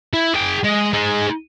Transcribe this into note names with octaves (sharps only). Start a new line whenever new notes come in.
E4
G#4 G5
G#3
D#4 G#4